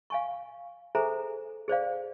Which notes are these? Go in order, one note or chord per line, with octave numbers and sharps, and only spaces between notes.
F5 G#5 C#6
G#4 A4 C5 E5 G#5 A#5
G#4 C5 D5 F5